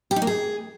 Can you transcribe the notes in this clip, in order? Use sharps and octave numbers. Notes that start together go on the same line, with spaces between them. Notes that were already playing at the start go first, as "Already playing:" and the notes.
G4
D#4
A#3
G#4